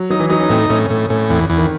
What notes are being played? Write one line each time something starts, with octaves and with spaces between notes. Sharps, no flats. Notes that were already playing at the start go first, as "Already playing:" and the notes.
Already playing: F#3
F#3 D#4
E3
F#3 D#4
C#4
A2 C4
A2 C#4
A2
A2 C#4
E2 C4
E2
D#3